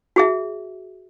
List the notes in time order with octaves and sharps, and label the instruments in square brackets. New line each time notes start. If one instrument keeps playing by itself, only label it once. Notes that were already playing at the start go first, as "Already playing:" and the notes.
[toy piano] F#4 G#4 E5